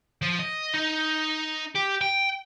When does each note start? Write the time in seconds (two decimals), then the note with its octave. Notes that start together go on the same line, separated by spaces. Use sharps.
0.22 F3
0.39 D#5
0.74 D#4
1.75 G4
2.01 G5